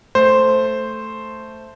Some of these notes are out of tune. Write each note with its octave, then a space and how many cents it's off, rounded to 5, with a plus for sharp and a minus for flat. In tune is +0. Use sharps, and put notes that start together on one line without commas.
A3 +0 C5 +0